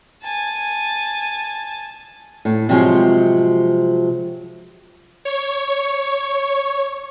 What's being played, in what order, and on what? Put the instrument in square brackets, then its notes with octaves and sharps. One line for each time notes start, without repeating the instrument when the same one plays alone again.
[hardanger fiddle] G#5 A5
[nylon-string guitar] A2
C3 F3 F#3 G#3
[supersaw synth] C#5 C#6